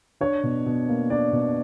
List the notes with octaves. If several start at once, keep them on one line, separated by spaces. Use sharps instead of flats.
D4 C#5
B2
B2
A#3
D4 D5
B2